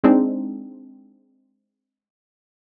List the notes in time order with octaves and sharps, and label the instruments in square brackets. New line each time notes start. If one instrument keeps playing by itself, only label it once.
[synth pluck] G#3 C4 D4 D#4